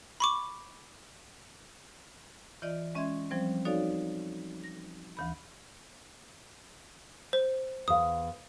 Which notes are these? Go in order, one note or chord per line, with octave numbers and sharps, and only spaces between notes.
B5 C#6 D6
E3 F4 D5 D#5
G#3 C#4 D#5 E5 C6 G#6
F3 G3 C4 C5
D#4 F#4 A4 C#5 D5 F5
A#6
D2 E3 B5
C5
E2 F5 D#6